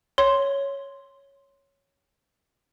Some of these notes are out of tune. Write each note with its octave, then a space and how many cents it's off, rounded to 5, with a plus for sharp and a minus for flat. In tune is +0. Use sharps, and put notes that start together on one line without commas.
C#5 +0 C6 +0